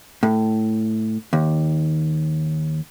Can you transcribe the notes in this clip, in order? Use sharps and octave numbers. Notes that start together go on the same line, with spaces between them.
A2
D#2